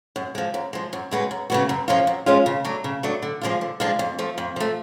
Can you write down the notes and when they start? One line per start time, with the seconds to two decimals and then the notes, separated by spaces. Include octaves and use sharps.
0.16 F#2
0.35 F3 G#3
0.54 F#2
0.73 F3 G#3
0.93 F#2
1.11 C#3 G#3 B3 F#4
1.31 F#2
1.50 C#3 G#3 B3 F#4
1.69 F#2
1.88 F3 G#3 C#4 F4
2.07 F#2
2.26 F3 G#3 C#4 F4
2.46 C#3
2.65 F#3 A3 D4
2.84 C#3
3.03 F#3 A3 D4
3.22 D3
3.41 F3 G#3 D4 F4
3.61 D3
3.80 F3 G#3 D4 F4
3.99 F2
4.19 F3 A3
4.38 F2
4.56 F3 A3